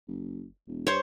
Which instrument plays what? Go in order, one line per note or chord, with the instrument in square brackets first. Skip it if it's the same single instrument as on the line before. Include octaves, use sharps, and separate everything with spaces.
[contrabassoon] F#1
E1
[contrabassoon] G2 [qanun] C5 C#5